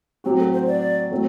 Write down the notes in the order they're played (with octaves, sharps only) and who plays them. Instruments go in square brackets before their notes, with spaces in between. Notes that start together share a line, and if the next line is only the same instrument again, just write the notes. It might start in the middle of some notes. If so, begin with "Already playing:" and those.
[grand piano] A2 F#3 C4 F#4 [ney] G4
[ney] A4
C5
D5
[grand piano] A2 F#3 A3 C4